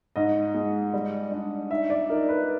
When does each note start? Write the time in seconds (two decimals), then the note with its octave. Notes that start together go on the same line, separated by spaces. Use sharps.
0.16 G#2 D#5
0.54 G#3
0.94 G3
1.32 D4
1.70 D#4 E5
1.90 D5
2.09 D#4 A#4
2.29 B4